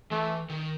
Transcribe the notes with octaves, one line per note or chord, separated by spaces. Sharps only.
E3 A3
D#3